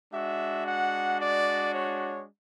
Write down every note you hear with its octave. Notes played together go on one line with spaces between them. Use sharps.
G#3 D4 F#4 E5
F#5
D5
C#5